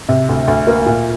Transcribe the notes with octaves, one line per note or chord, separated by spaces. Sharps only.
C3
D2
D2
A#3
A#2